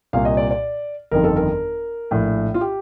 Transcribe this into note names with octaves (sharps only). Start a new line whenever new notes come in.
C2 A#2 F5
D#5
D5
D5
G1 F2 D#3 A#4
A4
A#4
A#1 A2
F4
G4